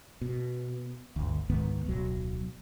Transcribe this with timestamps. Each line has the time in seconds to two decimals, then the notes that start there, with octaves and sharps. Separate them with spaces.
0.21 B2
1.16 G1 D2
1.49 C#2 G#2 D#3 B3
1.85 D1 B1 F#3